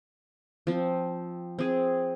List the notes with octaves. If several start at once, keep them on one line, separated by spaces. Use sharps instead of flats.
F3 C4
C4 G#4